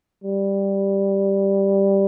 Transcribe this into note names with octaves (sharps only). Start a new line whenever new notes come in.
G3